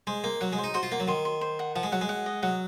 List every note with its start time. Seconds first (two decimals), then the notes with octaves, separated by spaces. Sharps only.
0.07 G#3 C5
0.24 A#3 C5
0.41 F#3 F#5
0.53 G#3
0.58 C5
0.64 D#4
0.74 F#4 C5
0.83 F4
0.92 A#3 F#5
1.00 F#3
1.08 D#3 C6
1.25 C6
1.41 C5
1.59 F#5
1.76 F3 F#5
1.83 G#3
1.92 F#3 F#5
2.01 G#3
2.09 F#5
2.26 D#5
2.43 F#3 F#5